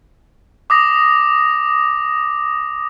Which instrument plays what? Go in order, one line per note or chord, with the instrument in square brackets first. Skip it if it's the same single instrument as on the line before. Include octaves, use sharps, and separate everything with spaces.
[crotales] D6 D#6 A#6